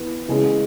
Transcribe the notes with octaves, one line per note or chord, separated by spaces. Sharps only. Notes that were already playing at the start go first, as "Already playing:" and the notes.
Already playing: E3 B3
C#3 E3 G#3 C#4 G#4